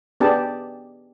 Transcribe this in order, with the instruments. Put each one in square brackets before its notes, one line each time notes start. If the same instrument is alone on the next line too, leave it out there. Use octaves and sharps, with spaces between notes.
[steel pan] B3 D4 G4 G#4 D5 A5